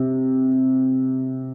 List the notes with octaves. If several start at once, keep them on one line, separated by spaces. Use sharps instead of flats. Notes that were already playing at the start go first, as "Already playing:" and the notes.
Already playing: C3